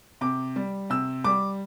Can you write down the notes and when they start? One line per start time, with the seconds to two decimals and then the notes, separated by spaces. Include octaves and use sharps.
0.21 C3 D6
0.56 G3
0.90 C3 E6
1.24 G3 D6